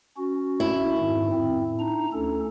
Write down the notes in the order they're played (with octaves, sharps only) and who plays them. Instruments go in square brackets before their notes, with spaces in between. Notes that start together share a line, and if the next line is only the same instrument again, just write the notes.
[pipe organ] C#4 F#4
[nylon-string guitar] E4
[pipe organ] F2 G#2 D#3
A2 C4
D4 D#4 A#5
D2 C#4 A4